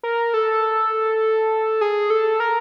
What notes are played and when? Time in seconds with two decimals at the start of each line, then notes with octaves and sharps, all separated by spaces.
0.03 A#4
0.34 A4
1.81 G#4
2.10 A4
2.40 A#4